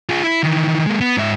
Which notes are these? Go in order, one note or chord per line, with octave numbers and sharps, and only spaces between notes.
F4 G#4
E4
D#3 E3
G#3 A#3
B3
G#2 E5